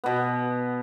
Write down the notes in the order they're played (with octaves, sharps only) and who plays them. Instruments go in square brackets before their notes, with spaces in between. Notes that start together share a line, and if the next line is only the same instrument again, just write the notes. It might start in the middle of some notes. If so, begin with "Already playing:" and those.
[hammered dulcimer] B2 B3